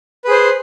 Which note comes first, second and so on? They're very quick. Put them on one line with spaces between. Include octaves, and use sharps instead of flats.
B4 G#4 C5